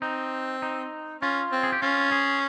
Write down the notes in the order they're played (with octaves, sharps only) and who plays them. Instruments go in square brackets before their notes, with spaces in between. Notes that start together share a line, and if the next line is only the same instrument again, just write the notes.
[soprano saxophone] C4 [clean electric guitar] D#4
[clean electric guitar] D#4
[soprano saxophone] C#4 [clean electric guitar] F4
[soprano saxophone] C4
[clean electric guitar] G#4
G4
[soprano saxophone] C#4 [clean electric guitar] F4
[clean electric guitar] G#4